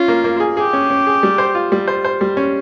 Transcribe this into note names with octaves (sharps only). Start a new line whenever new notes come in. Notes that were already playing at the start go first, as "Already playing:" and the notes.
Already playing: C#4 F4
A#3
A#3
G#4
G4 G#4
C#4
C#4
G#4
G3
C5
F4
G3
C5
C5
G3
C#4